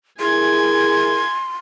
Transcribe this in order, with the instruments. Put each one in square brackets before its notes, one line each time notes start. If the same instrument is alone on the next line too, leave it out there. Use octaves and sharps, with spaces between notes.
[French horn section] E4 G#4 A#4 [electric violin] G#5 G#6 [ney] C6